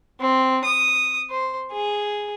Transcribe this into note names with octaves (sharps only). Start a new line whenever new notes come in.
C4
D#6
C5
G#4